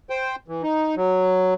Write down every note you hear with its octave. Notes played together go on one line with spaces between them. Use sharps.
C5 G5
E3
D#4
F#3